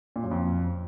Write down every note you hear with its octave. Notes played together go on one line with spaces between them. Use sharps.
A#2
F#2
F2